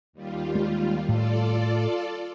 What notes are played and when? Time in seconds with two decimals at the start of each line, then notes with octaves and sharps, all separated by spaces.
0.13 D#2 G3 F4
0.55 G#3
1.08 A2 F4 A4 D5